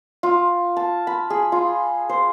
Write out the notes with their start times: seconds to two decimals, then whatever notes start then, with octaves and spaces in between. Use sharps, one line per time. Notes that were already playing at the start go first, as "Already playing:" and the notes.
0.23 F4
0.77 A5
1.07 B5
1.30 G#4
1.52 F4
2.09 C5